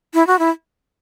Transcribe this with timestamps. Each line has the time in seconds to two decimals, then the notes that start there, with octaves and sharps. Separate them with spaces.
0.14 E4
0.27 F#4
0.39 E4